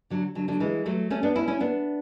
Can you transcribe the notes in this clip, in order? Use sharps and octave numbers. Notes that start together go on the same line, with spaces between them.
D3 F#3
D3 F#3
D3 F#3
E3 G#3
F#3 A3
A3 C#4
B3 D4
C#4 E4
C#4 E4
B3 D4